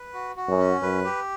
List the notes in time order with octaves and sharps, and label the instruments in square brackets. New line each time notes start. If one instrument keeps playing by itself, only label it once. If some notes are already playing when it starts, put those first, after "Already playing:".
Already playing: [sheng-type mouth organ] B4
F#4
F#4
[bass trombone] F#2
[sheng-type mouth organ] C#4
[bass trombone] F#2 [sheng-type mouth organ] B4
[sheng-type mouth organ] G4